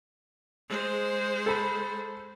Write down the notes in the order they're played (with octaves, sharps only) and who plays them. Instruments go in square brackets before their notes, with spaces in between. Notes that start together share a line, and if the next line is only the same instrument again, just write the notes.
[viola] G#3 C5
[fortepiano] A4 B5